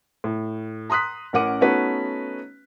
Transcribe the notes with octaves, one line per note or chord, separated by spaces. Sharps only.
A2
A#5 C6 D#6 F#6 B6
A1 C#4 A#4 F#5 D6 D#7
A3 B3 C#4 D#4 F#4 B4